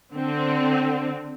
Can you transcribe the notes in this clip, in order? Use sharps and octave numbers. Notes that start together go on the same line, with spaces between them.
D3 C4